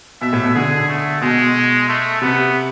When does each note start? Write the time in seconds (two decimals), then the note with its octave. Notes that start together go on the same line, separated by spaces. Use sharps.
0.21 B2 E5
0.33 A2
0.43 B2
0.55 D3 G#4
0.88 A3
1.21 B2 G#3
1.88 A3
2.22 C3 B3